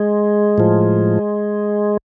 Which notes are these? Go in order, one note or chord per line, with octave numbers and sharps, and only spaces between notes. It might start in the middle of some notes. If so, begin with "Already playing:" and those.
Already playing: G#3
A2 F3